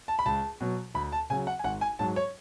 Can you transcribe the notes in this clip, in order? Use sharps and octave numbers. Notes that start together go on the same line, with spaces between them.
A5
B5
C#2 A5
B2 F#3
D2 B5
A5
C#3 F#3 G#5
F#5
G#5
G#1 F#5
G#5
G#2 F#3 A5
C#5